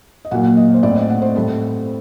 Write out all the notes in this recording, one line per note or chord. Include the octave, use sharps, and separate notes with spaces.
D#5
A#2 F#3 A#3 F#5
D#5
C5
A2 A3 C4 D5
D#5
F#5
C5
A2 G3 C4 A4